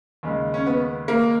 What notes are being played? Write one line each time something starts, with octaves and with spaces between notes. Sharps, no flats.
D#2 C#3 G#3
C#4
B3
A#3